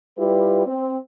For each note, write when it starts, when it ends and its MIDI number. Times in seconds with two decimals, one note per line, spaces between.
0.18 0.65 55
0.18 0.65 64
0.18 0.65 65
0.18 0.65 67
0.18 0.65 71
0.66 0.96 60